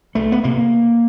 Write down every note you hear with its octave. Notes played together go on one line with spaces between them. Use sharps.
C2 A3
B3
C3 A#3